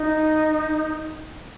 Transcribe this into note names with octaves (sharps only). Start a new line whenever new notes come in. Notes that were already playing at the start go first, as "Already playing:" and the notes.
Already playing: D#4